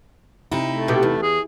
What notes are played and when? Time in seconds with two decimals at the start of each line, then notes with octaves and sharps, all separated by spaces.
0.51 C3 D#4 E4
0.70 A3
0.88 B2 G4
1.03 E2
1.22 G#4